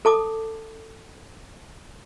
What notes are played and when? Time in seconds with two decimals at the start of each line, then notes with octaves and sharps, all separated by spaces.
0.05 A4 A5 D6 D#6